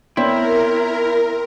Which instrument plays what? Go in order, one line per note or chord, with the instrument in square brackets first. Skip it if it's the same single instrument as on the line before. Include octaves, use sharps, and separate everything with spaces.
[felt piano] B3 C#5 D5 [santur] C4 [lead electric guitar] E4 [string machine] A#4